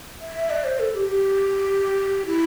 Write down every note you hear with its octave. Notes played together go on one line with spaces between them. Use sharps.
E5
D5
C5
A4
G4
G4
E4